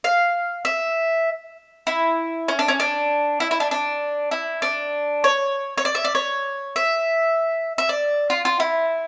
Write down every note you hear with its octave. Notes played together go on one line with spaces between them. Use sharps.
F5
E5
E4
C#4
D4
C#4
D4
E4
E4
D4
D4
E4
D4
C#5
C#5
D5
E5
D5
C#5
E5
E5
D5
F4
F4
E4